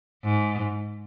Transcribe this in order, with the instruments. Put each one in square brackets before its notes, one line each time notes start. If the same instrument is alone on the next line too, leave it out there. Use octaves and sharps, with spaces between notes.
[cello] G#2